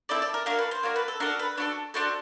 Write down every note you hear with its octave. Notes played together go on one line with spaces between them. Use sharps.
C4 E4 A4 D5
D5
A#4
A#3 D4 F#4 A#4
B4
C5
A#3 D4 F#4 A#4
B4
A4
D4 F#4 A4 A#4
B4
D4 F#4 A4 C#5
D4 F#4 A4 C5